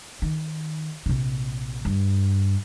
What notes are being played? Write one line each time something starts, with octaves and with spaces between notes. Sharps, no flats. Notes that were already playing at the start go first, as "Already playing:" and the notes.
D#3
A#1 C3
G2